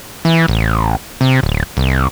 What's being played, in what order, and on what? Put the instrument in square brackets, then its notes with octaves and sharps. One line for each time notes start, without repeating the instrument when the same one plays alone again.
[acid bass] E3
A1
C3
D1
C2